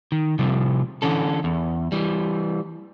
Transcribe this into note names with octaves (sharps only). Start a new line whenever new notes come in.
D#3
C3 F3 G3
D3 E3 C#4 A4
E2
E3 G3